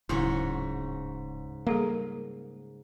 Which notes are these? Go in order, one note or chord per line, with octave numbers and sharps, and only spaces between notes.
D1 G#2 C#3 E4 F#4
G3 A#3 G#4 A4